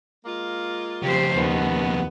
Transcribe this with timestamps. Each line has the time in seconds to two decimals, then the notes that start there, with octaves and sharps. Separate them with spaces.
0.25 G#3 A#3 F4
1.02 F2 C#3 G4 C5
1.35 D#2 B3